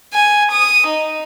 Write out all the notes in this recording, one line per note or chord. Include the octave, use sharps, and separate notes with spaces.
G#5
D#6
D#4